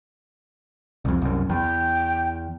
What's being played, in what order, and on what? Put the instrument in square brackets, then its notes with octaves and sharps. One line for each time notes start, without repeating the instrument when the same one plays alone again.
[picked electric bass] C2 F2
C2 F#2
[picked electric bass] E2 [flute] G5